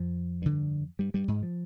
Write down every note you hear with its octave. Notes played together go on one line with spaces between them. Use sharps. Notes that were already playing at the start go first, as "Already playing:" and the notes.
Already playing: F2 F3
G2 D3
G2 G3
G2 G3
G#2 G#3
F3